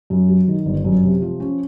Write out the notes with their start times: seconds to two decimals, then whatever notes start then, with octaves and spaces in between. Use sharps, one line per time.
0.10 F#2
0.28 F#3
0.48 D#3
0.66 G1
0.85 F#2
1.03 C3
1.22 F3
1.40 C#4